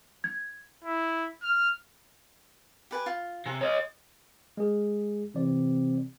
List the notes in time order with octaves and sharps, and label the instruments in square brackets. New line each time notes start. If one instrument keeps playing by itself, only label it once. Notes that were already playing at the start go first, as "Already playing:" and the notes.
[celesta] G#6
[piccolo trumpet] E4
F6
[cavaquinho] G4 B4 G#5
F4
[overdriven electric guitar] C3 [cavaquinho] G#5
[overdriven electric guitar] C#5 D#5
[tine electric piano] G#3 G#4
[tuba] C3 [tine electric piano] E3 D5